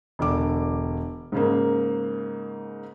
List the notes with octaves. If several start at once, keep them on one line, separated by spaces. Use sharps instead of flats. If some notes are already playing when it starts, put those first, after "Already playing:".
E1 D3 D6
G#2 C#3 A#3